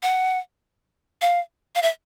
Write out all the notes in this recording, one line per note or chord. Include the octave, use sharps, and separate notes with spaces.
F#5
F5
F5
E5